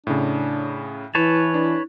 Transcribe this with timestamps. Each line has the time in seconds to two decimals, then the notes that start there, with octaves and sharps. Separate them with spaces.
0.07 A2 C#3 D4
1.15 E3 E4 B4 C#5 A5
1.54 D4